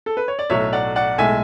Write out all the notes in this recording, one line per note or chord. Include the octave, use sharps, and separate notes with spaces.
A4
B4
C#5
D5
B1 A2 F#3 A3 C#5 E5
D5 F#5
D5 F#5
B1 A2 G#3 E5 G#5